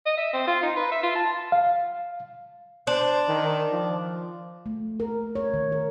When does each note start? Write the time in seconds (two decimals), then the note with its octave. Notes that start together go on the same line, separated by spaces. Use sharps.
0.06 D#5
0.17 E5
0.33 C4
0.47 F4
0.62 D#4
0.76 B4
0.92 E5
1.03 F4
1.16 A5
1.52 F5
2.87 D4 C5
3.28 D#3
3.73 F3
4.66 A3
5.00 A#4
5.35 C#5
5.54 D#3
5.72 A#4